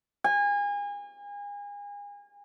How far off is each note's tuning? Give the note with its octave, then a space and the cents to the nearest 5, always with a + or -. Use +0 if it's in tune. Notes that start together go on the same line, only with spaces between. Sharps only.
G#5 -35